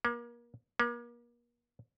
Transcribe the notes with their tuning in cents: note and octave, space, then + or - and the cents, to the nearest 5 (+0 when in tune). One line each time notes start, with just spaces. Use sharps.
A#3 +35
A#3 +40